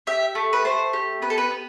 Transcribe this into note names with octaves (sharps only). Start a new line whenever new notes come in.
G4 E5
A3
B4
A3 C5
G4
B3 B4
A4
B4
B3